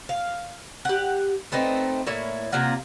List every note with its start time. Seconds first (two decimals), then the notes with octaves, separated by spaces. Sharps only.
0.09 F5
0.85 G4 F#5
1.52 A3 B3 C4 D#4
2.07 A2 A#3 E4 C#5
2.52 C3 A#3 F4 F#5